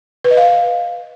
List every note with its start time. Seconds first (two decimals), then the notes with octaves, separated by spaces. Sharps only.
0.24 B4
0.31 D#5
0.37 F5